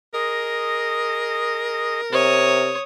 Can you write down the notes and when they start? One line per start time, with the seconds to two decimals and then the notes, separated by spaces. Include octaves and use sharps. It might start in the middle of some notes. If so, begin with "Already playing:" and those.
0.14 G#4 A#4 D#5
2.12 C3 C#5 D#6